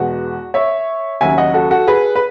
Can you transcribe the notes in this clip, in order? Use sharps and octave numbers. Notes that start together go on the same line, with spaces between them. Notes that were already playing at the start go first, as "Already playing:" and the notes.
Already playing: E2 B2 G#3 F#4
C#5 E5
D#2 C#3 F#3 C#4 E5 G#5
D#5 F#5
F#4 A4
F#4 A4
G#4 B4
B4